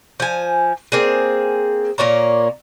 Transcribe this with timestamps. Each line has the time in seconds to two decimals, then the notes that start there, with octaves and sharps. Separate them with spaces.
0.20 F3 G#5
0.92 A#3 C4 G#4
1.98 A#2 A#3 C#5 A#5